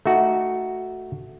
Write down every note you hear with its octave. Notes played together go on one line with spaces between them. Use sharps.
A3 D#4 F#4